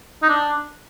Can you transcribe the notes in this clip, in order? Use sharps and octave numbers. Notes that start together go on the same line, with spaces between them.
D#4
D4